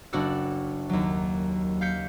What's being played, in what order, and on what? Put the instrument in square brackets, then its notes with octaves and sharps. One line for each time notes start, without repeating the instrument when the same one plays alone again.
[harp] F#1 D4 F#4 A4
D#2 F#3
F5 G6 B6 C#7